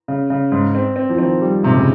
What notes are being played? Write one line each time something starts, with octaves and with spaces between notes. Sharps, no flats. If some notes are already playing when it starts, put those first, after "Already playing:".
C#3
C#3
G#2
C4
C4
F3
D#3 C4
G3
G#2 C3
C#3